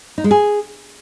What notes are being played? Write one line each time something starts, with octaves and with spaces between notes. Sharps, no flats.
D#4
G#3
G#4